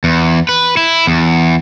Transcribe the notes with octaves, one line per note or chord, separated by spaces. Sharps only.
E2
B4
E4
E2